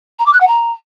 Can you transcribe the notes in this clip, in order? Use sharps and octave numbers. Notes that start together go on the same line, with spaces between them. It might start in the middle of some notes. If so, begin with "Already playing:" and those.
A#5
D6
F#6
F#5
A#5